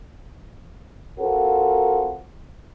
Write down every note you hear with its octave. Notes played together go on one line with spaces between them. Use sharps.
C4 F4 F#4 A4 A#4